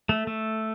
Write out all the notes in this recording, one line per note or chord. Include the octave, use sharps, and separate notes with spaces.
A3
A3